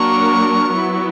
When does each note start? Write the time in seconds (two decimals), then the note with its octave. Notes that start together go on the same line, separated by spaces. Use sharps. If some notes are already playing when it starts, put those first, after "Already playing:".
Already playing: F#3 A#3 D4 A#4 C#6
0.70 F#3 B3 E4